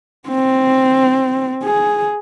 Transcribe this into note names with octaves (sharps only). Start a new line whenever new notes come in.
C4
G#4